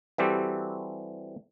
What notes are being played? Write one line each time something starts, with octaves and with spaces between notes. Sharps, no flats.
E3 G3 C4 F#4 G4 A4